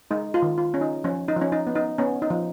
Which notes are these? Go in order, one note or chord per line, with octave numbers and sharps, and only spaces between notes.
G#3 D#4
F4
D#3
F4
C#4
D#4
F3 C#4
D#4
F3
C#4
D#4
B3
D#4
B3 C#4
D#4
F3